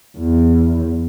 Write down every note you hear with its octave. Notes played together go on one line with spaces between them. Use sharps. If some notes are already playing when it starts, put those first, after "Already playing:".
E2